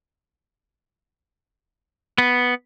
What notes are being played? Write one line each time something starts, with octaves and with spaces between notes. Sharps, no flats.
B3